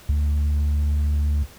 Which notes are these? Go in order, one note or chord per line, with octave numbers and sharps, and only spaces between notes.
D2